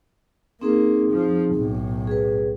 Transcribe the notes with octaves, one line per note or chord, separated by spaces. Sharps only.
A#3 C4 D#4 G#4
F3
B1 A2
G#4 B4